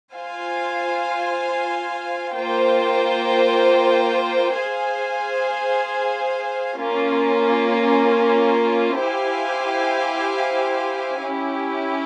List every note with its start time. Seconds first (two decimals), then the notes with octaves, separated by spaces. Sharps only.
0.14 F4 C5 F5 G#5
2.36 A#3 F4 C5 G5
4.57 G#4 C5 F5 G#5
6.79 A#3 C#4 F4
9.00 E4 G4 C5 F5 G#5
11.21 C#4 E4 G4